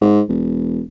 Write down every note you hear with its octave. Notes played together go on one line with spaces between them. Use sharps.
G#2
E1